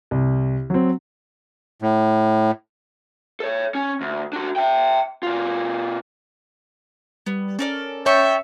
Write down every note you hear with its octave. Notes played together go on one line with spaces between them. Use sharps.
C2
F#3 C4
A2
A4 C#5
C#4
D2
D4 F#4
E5 G5
B2 F4
G3 B3
C#4 A4 A#4 D5
C#5 E5 G5 A5 C#6